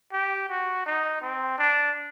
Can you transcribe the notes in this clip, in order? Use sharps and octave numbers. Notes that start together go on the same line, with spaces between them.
G4
F#4
D#4
C4
D4